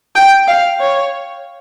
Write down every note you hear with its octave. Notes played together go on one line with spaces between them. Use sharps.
G5
F5
C#5